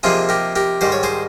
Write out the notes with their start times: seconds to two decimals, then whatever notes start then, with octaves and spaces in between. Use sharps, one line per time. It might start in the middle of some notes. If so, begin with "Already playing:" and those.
0.03 C3 F3 A#3 D#4 F4 G#4
0.29 G4 A#4
0.56 G4 A#4
0.81 G#2 D#3 G3 C5
0.92 C#5
1.03 G#4 C5